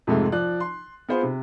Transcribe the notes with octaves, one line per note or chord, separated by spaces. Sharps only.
F2 G#2 C3 G#3 A3
F3 D5 F#6
C6
B3 F4 G#4 C5
C3